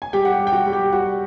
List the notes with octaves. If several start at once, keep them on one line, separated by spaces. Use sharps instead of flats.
G#5
G3 G4 G5
F#5
G4 G5
G3
G5
F#4 F#5
G3
G4 G5
G3 F#4 F#5